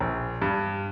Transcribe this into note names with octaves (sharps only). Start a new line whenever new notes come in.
A#1
G2